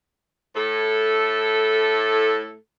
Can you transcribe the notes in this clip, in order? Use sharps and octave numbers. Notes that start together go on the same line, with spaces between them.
A2 A4